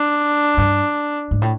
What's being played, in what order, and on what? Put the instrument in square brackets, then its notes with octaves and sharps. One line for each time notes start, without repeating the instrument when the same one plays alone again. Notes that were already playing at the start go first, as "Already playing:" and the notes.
Already playing: [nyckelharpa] D4
[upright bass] G2
G#2
A2